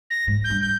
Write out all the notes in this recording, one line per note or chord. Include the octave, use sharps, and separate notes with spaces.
A#6
G#2
G6
G2
G6